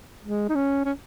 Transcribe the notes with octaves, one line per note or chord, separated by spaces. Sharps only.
G#3
D#4
C#4
C#4